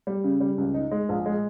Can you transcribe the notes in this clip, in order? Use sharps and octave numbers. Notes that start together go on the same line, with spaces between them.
G3
C#3
G3
C#2
D#4
G#3
A#1
G#3